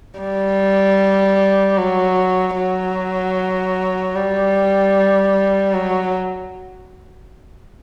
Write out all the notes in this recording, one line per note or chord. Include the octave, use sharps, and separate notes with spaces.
G3
F#3
F#3
G3
F#3